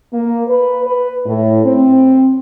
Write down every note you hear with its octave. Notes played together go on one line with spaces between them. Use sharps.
A#3
B4
B4
A2
C4